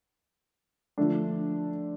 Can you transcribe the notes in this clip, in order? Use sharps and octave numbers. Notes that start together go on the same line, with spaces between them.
D3 F3 A3 D4